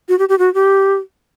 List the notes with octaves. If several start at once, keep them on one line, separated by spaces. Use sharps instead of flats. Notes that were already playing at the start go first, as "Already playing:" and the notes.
F#4
G4
G4
F#4
G4